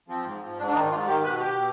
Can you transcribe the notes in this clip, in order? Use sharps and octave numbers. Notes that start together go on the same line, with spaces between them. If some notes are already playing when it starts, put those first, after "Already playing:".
F3 C4
G#2
F3
G#2 D4
D4
D#3 D#4
G#2 F4
D#3 G4
B2 B4
G4
B2